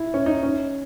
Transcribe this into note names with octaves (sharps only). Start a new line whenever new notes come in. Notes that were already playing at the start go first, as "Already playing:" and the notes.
Already playing: E4
C#4
D#4
C#4